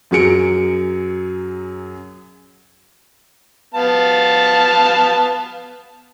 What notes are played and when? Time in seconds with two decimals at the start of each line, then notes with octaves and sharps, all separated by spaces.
0.11 F#2 F#3 G#4 C#7 D7
3.74 B3 F5 A5